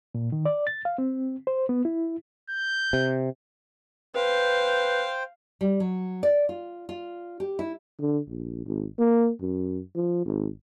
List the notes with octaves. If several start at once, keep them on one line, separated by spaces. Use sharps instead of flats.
A#2
D#3
D5
A6
F5
C4
C5
B3
E4
G6
C3
B4 C5 F5 G5
G3
F#3
D5
F4
F4
G4
E4
D3
A#1
G#1
A#3
F#2
F3
G#1